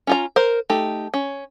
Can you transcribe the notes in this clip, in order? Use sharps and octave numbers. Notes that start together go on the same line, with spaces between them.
C#4 F4 A#5
A#4 C5
A3 D#4 G4
C#4